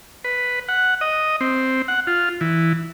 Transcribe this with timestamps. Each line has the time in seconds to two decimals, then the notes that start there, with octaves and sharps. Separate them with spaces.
0.24 B4
0.69 F#5
1.01 D#5
1.41 C4
1.88 F#5
2.07 F4
2.41 E3